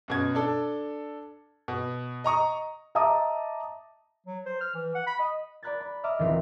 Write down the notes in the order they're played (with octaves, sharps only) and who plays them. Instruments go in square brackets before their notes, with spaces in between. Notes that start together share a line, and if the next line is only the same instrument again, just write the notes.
[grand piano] F#2 B2 G#6
D4 A4
B2
D#5 A#5 C#6 D#6
[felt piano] D#5 E5 A5 A#5 D6 D#6
[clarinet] F#3
C5
F6
E3
F#5
B5
D#5
[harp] D5 A#5 B5 F#6 G#6 A6
B5
D#5 E5 A#5 D6 F6
D#1 D#3 E3 C4 F5 B6